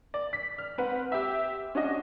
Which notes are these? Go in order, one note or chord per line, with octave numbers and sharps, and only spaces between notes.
D5
B6
F6
C4 B4 F#5
G4 E5
C#4 D4 F#4 D#5